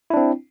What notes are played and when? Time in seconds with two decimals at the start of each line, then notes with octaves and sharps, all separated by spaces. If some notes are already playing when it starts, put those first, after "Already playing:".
0.10 E4
0.14 D4
0.17 C4